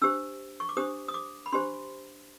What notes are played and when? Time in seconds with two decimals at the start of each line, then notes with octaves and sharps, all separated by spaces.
0.02 D4 G4 C5 E6
0.60 C#6
0.69 D6
0.77 D4 G4 C5 D#6
1.08 D#6
1.14 D6
1.46 B5
1.52 D4 G4 C5 C6